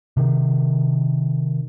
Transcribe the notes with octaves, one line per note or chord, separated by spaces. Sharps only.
C3 D#3